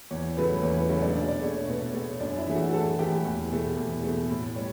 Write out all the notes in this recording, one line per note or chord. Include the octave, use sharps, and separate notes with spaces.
E2 C#5
C#3 F#3 A3 B4
E2 C#5
B4
C#3 F#3 A3 C#5
D4 D5
B2 D4 D5
D4 D5
A3 C#5
C#5
B2 B4
A3 C#5
F#2 D4 D5
E4 E5
E3 A3
F#4 F#5
F#2 A4 A5
E3 A3 G4 G5
E2
B2 A3
E2
B2 A3
A2
G3 C#5